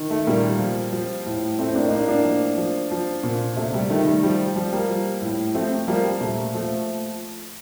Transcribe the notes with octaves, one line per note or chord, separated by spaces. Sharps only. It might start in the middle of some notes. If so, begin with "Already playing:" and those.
Already playing: D#3
A3
A#2 G3 A#3
F3
F3
A2
A2 A3 C4
A#3 D4
D#4
A2 A#3 D4
A#3 D4
F3
F3
F3
A#2
C3 A3
G3
D#3 A3
G3
F3 G3
F3 G3
G3 A#3
F3
A2
F3 A3 C4
F3 G3 A#3
G3
A#2 A3
F3 A3